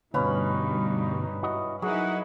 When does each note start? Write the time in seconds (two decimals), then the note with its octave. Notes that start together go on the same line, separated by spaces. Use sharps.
0.14 D2 G2 B2 C#4 D#4 B4 F5
1.43 E4 F#4 D#5
1.82 F#3 D#4 E4 G#4 A#4 F#5